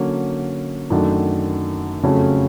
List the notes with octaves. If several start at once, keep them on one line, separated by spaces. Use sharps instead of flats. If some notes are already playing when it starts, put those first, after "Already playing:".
Already playing: D3 F#3 A#3 C#4
F#2 D#3 F#3 A3 D4
F2 C#3 F#3 A3 C#4